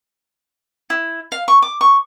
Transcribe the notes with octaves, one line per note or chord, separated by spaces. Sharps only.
E4
F5
C#6
D6
C#6